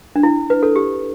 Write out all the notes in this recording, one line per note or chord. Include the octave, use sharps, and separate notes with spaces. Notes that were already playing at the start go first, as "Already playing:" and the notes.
D4
E4
B4
A4
G4